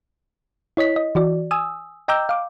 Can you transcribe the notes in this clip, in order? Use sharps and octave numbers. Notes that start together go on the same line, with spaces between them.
E4 C#5 D#5 B6
D#5
E3 F#4 D5
G#5 D#6 E6
D#5 G5 A#5 D6 E6 G6
F5 D6